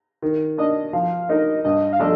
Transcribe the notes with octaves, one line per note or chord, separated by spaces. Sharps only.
D#3
A#3 D4 D#5
F3 F5
A#3 D#4 A#4 D#5
G2 D#5
F5
F3 A3 D4 A4 D#5